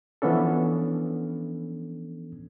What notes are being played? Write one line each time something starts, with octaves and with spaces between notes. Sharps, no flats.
E3 F3 B3 C#4 D4 A4